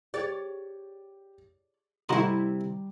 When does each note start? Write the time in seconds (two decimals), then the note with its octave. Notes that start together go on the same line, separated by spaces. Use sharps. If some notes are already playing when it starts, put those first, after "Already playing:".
0.14 G4 G#4 C#5 D5
2.09 A2 C3 G3 E4 F#4 D#5 A#5 C6